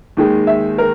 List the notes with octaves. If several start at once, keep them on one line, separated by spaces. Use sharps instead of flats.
D#2 D#3 G#3
E5
A#4